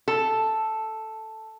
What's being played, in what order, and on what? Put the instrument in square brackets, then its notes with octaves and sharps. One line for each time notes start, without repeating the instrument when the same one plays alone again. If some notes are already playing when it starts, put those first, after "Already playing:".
[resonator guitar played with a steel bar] A4